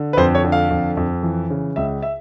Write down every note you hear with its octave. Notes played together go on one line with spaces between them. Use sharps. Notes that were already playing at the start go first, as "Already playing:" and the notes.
Already playing: D3
B4
F2 C5
C#5
D3
F5
F2
F2
E3
C#3
C#2 E5
E5